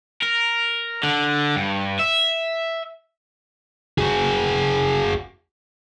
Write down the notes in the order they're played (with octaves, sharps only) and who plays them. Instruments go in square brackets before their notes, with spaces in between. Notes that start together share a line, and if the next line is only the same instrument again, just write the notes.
[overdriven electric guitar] A#4
D3
G2
E5
[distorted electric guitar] F#4 G#4